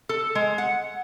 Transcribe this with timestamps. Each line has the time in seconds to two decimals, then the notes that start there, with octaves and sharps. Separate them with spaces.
0.09 A4
0.35 G#3
0.58 F#5